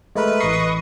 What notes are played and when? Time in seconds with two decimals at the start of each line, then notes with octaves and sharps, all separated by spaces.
0.16 G#3 A3 A#4 B4
0.40 A1 D#5 C#6 C7